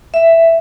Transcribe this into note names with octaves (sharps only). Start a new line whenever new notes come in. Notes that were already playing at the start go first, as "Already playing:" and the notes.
E5